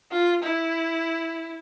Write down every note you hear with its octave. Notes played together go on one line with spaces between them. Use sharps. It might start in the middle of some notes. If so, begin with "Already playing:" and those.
F4
E4